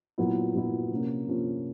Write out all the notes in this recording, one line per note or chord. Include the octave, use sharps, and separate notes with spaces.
A#2 F#3 B3 E4
A#2 F#3 B3 E4
C3 F3 A#3 C#4
C3 F3 A#3 C#4